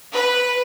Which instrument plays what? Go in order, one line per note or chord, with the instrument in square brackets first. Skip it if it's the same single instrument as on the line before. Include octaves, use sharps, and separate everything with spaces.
[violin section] B4